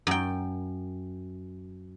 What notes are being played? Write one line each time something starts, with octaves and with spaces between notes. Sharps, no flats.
F#2 G5